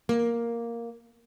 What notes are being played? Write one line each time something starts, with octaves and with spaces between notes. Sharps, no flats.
A#3